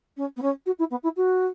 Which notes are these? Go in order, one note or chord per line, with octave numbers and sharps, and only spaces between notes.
C#4
B3
C#4
F#4
E4
B3
E4
F#4